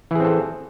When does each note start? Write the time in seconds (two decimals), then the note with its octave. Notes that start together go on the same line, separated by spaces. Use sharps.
0.11 E3
0.15 G#4
0.20 C4
0.24 A4